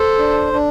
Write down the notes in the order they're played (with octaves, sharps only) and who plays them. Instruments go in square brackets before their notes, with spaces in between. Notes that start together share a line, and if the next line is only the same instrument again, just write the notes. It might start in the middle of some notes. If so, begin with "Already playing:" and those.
Already playing: [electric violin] A4 [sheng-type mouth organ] C5
[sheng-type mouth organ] D4
D4